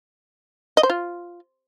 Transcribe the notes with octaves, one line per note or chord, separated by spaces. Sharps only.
D#5
C5
F4